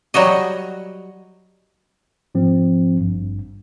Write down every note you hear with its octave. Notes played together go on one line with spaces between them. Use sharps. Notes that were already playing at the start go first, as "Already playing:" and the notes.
F#3 G3 F#4 D#5
G#2 F3 C4
G#1 G2